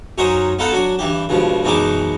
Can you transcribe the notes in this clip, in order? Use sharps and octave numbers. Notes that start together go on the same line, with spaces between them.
F#2 F#3 C#4 D#4 C5 D#6
B3 D#4 F4 A4 F#5 A5
F#3 D4 F#4
G2 E3 G4
C#2 G2 B2 F3
F#2 B2 E3 G#3 D#4 D6